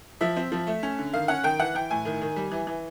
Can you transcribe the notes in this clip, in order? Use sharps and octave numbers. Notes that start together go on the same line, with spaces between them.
F3 E5
C4
F3
A3
C#4
D3
D#3 F5
C#4 F#5
D#3 G5
E3 F#5
E3 G5
A2 G#5
D#3
D#3
G3
E3
E3